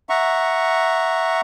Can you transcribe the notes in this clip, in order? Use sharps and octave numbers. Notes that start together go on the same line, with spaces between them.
E5 F#5 A#5 C#6